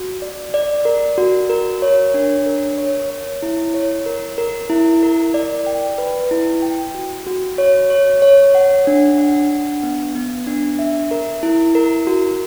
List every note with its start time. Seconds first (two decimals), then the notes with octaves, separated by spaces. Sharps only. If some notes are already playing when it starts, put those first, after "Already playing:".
Already playing: F#4
0.22 D5
0.54 D5
0.85 A#4
1.18 F#4
1.50 A#4
1.82 C#5
2.14 D4
2.46 A#4
2.78 C#5
3.10 C#5
3.42 E4
3.74 C#5
4.06 A#4
4.38 A#4
4.70 E4
5.03 A#4
5.34 D5
5.66 G5
5.98 B4
6.31 E4
6.62 G5
6.95 F#4
7.27 F#4
7.58 C#5
7.90 C#5
8.22 C#5
8.55 F#5
8.87 D4
9.18 F#5
9.51 D4
9.83 B3
10.15 B3
10.47 D4
10.79 E5
11.11 A#4
11.43 E4
11.75 A#4
12.07 F#4